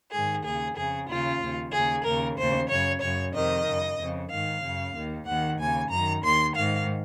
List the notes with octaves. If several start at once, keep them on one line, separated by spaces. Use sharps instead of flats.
G#2 D#3 G#4
D#2 C#3 G#4
F2 C#3 G#4
D#2 C#3 F4
D#2 C#3
D#2 C#3 G#4
D#2 C#3 A#4
D#2 C#3 C5
F#2 C#3 C#5
F#2 C#3 C#5
F2 C3 D#3 D#5
F#2 C#3
F2 C#3
G#2 D#3 F5
F#2 C#3
D#2 D#3
D#2 D#3 F#5
D#2 C#3 G#5
F#2 D#3 A#5
D#2 D#3 C6
G#2 D#3 F5